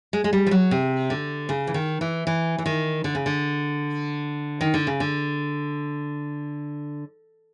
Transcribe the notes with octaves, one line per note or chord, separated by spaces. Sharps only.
G#3
G#3
G3
F3
F#3
C3
D3
C#3
E3
D#3
E3
E3
E3
D#3
D3
C#3
D3
D#3
D3
C#3
D3